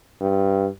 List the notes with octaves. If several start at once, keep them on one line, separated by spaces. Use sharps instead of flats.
G2